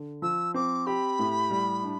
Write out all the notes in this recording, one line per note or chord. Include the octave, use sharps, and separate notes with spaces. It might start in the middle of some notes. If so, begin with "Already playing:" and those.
Already playing: D3
F3 E6
C4 D6
G4 B5
A2
G3
D4